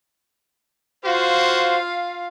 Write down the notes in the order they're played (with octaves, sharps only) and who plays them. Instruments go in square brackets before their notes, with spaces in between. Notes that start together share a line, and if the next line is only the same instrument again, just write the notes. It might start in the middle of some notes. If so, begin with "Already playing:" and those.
[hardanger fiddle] F4 F5 [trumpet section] F#4 C5